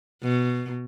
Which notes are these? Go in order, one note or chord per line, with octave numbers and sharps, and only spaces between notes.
B2